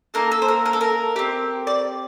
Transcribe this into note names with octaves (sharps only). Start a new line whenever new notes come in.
A#3 D#4 A4 A#4
A4
C5
A#4
A#4
A4
A#4
C4 G4
D5